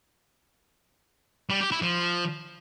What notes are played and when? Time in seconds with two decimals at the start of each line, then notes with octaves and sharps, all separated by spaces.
1.50 G3
1.61 G4
1.71 E4
1.82 F3